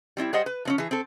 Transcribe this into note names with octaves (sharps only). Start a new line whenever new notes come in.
G3 C4 C#4 E4
G3 G#4 C5 D#5 F#5
B4
F3 C4 C#4
E3 G#4
C4 A4